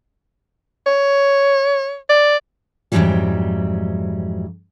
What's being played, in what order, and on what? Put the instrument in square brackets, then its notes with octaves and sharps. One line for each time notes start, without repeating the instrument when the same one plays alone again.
[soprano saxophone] C#5
D5
[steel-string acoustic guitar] F2 G#2 C3 E3 F#3 G3